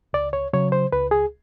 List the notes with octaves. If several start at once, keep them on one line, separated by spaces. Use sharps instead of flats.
C#2 D5
C#5
C#3 F#3 C#5
C5
C#2 B4
G#4